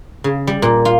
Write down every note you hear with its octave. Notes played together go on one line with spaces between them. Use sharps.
C#3
G3
A#2
F4